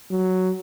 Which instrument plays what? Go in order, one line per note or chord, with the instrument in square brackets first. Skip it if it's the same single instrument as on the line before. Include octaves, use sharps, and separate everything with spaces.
[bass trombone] F#3